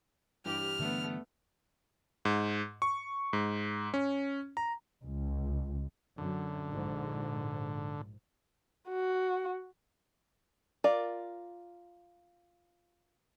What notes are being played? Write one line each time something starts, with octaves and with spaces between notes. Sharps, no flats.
G2 E3 G4 F6
G2 D3 E3 G3 A3 B3
G#2
C#6
G#2
C#4
A#5
C#2
F#2 D3
A#1 G#2
F#4
F4 A#4 D5